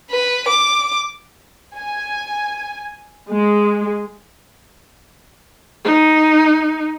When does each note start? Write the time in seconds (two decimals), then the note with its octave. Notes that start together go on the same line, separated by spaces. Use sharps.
0.11 B4
0.49 D6
1.76 G#5
3.31 G#3
5.85 D#4